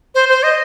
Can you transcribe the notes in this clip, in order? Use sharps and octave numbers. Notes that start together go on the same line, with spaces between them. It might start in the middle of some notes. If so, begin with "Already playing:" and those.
C5
C5
D#5